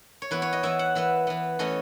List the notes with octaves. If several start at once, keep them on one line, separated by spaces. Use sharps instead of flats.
C#5
E3 B3 B4
C#5
D#5
E3 B3 E5
F#5
E3 B3 E5
E3 B3
E3 A3 C#4 D#5